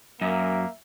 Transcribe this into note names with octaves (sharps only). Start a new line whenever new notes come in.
F#2 A#3 E5